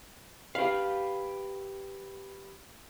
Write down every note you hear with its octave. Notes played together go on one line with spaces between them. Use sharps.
G4 B4 F5